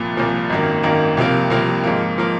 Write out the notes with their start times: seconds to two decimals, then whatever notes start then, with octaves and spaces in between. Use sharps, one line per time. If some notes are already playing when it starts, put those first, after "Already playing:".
Already playing: C2 A#2 F3
0.17 C2 A#2 F3
0.50 G#1 F#2 D#3 A#3
0.83 G#1 F#2 D#3 A#3
1.17 C2 C3 F3 A#3
1.50 C2 C3 F3 A#3
1.84 G#2 F3 A#3
2.18 F3 A#3